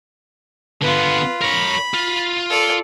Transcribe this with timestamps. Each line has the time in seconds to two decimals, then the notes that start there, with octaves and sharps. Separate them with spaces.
0.82 D3 B3 F4 B4
1.42 A#4 C#5 B5
1.94 F4
2.50 A4 D5